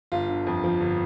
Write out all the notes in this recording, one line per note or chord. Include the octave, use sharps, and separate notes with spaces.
G1 F4
D3
F2
F3
G1